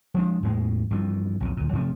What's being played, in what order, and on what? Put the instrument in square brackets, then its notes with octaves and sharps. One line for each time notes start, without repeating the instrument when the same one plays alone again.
[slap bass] F3 G#3 D4
E2 A2 G#3
G2 E3 F3
B1 F2 A#2
D2 A#2
F#2 C3 F3 A3